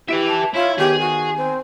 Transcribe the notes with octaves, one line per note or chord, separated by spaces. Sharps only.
E4 G4 B4 E5 D7 F7
A5 D7
E4 F4 C#5
D#3 B3 G4 G#4
F#4 G#5
C4